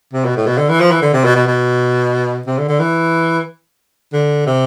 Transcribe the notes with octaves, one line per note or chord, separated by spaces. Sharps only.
C3
B2
A2
B2
D3
E3
F3
E3
D3
C3
B2
B2
B2
C3
D3
D3
E3
D3
C3